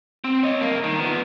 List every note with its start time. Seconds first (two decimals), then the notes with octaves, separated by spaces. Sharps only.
0.24 C4
0.43 C#5 D#5
0.61 G2 A#3
0.84 D#3
1.00 F3 B3